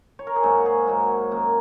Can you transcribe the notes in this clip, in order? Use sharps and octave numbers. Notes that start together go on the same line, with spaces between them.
C#5
A#4
G#4
G#2 F#3 A#3 F#4
F#4
G#4
G#2 F#3 A#3 F#4
F#2 D#3 A#3